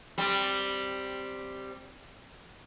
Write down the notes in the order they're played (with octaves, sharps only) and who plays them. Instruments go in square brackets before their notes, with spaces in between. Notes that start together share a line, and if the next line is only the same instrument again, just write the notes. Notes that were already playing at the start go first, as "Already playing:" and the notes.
[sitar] G3 C4